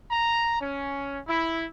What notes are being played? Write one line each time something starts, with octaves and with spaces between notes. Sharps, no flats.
A#5
C#4
E4